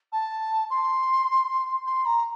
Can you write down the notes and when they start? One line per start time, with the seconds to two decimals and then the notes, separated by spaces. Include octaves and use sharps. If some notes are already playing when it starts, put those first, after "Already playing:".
0.13 A5
0.70 C6
1.87 C6
2.06 A#5